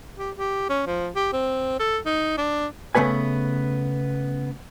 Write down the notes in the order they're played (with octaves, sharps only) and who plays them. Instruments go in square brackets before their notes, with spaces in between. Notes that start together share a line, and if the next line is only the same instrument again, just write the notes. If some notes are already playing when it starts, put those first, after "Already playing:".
[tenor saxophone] G4
G4
C#4
F3
G4
C4
A4
D#4
D4
[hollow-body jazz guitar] C#3 A3 B3 B4 G#5